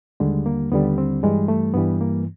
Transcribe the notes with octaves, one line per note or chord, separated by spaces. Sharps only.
D#2 D3 G3 G#3
A#3
D#2 D3 G3 B3
C4
G2 E3 G3 G#3
A3
G2 E3 G3 B3
A#3